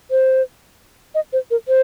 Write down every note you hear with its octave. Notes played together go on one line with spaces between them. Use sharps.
C5
D#5
C5
A#4
C5